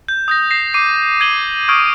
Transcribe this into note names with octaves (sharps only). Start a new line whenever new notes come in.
G6
D#6 G6 A#6
A#6 C7 E7
D6 C7 D#7
G#6 D#7 F#7 G7
C#6 D#6 F6 G#6 D7